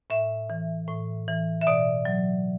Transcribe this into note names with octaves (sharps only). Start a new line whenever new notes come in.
A2 E5
E3
A2
E3
E5
B2 D5
F#3